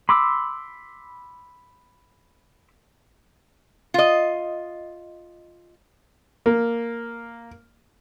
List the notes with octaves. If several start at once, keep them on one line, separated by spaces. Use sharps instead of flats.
B5 C6 D6 E6
F4 D#5
A#3